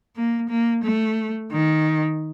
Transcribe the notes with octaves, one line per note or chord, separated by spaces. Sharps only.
A#3
A#3
A3
D#3